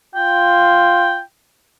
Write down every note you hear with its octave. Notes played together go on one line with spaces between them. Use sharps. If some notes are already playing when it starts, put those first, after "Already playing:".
F4 G5